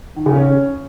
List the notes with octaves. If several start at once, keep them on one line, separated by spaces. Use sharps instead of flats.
D#3
C#3
C#4